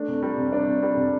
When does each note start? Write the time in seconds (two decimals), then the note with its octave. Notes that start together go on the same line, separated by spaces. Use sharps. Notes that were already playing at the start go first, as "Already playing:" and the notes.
Already playing: A3 D4
0.08 C3
0.23 G3
0.38 C3
0.52 D4
0.68 C3
0.83 G3
0.97 C3